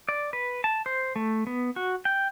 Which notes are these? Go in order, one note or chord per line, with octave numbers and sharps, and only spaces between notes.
D5
B4
A5
C5
A3
B3
F#4
G5